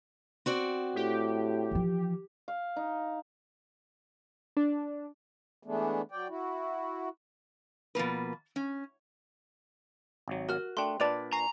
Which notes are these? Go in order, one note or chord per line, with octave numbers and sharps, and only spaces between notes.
C4 F#4 D5
A2 G4
E3 F3
F5
D#4
D4
E3 G#3 A3 B3 D4
F#3 D5 G5
E4 F#4
B2 F3 A#3 B4
C#4
G#1 F#3
F#4 A#4 F6
A3 D4 G5 C6
A#2 D4 B4 D5 A5 F7
G#5 A#5 C#6 C7